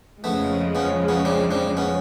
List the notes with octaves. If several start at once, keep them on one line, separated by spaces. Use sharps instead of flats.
F2 C#3 F3 G#3 A3 B3
B3 C#4
B3 C#4
C4 D4
C4 D4
B3 C#4